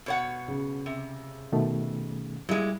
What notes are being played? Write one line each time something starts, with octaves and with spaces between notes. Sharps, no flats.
B2 C#5 F#5
C#3
C3
B2 D#3 A3
A#2 G3 G#3 E4